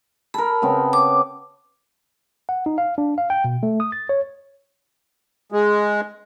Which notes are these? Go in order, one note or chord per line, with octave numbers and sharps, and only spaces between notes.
A4 A#4 B5
C#3 B3 C4
D6
F#5
D#4
F5
D4
F5
G5
B2
A3
D#6
A6
C#5
G#3